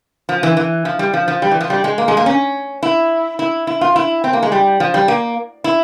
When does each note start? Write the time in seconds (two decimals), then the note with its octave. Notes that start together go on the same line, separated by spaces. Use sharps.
0.29 F3
0.43 E3
0.57 E3
0.85 F3
0.99 G3
1.14 F3
1.28 F3
1.42 G3
1.51 E3
1.61 F3
1.70 G3
1.84 G#3
1.98 A#3
2.08 G#3
2.17 A#3
2.26 C#4
2.83 E4
3.39 E4
3.67 E4
3.81 F4
3.96 E4
4.24 C4
4.33 A#3
4.42 G#3
4.52 G3
4.80 F3
4.94 G3
5.08 A#3
5.64 E4